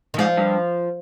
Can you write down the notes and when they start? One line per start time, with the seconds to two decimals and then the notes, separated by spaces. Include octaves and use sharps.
0.14 D#3
0.18 G#2 F3
0.37 G2